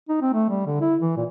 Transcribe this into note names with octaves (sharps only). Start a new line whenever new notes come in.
D#4
C4
A3
G3
D3
E4
E3
A#2